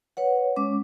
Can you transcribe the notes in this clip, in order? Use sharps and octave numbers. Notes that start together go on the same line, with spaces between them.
B4 C#5 F#5
G#3 C#4 D6